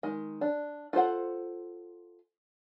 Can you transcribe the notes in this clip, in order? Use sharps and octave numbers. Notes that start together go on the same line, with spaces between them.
D#3 G#3
D4
F4 A4 C5 F#5